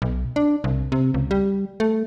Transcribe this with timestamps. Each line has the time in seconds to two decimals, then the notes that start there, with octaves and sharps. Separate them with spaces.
0.02 B1
0.36 D4
0.64 C2
0.92 C3
1.14 C#2
1.31 G3
1.80 A3